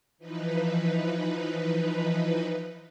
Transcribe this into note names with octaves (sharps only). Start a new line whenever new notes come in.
E3 F3 D#4 B4